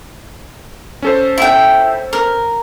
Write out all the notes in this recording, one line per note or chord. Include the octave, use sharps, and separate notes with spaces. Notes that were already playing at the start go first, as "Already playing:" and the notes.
C#4 A4 C5
E4 G5
A#4